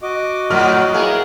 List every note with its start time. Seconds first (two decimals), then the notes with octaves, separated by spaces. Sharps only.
0.02 F#4 D#5 D6
0.50 F#2 A2 D#3 F#3 F6
0.94 A#3 B3 E4 G#4 A#4